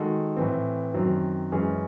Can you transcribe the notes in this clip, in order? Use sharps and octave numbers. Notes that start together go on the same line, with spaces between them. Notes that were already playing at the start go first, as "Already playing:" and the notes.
Already playing: D#3 G#3 D#4 F#4 A4
A2 E3 C4
F#2 D#3 F#3 C4
F#2 E3 G#3 C#4 G#4